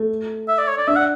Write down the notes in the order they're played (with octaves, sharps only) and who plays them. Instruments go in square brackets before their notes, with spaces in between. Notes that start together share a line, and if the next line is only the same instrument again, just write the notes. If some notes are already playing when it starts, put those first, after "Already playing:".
Already playing: [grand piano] A3
[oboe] E5
D5
C#5
D5
[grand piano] D4 [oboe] E5
[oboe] F#5